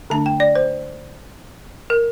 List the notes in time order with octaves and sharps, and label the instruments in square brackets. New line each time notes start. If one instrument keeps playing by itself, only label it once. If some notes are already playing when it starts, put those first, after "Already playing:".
[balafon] D3 A3 D4 A5
G5
D5
C5
A#4